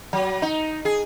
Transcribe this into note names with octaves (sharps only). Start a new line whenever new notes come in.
F#3
D#4
G#4